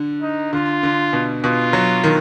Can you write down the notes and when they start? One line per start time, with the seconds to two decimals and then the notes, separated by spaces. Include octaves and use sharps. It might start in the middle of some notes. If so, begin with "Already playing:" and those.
Already playing: D3
0.22 D#4
0.53 D3 F4
0.83 D3
1.13 B2
1.44 B2 F4
1.73 F#3
2.04 D#3